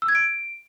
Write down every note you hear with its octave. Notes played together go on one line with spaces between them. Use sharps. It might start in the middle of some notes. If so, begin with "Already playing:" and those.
E6
G#6
D7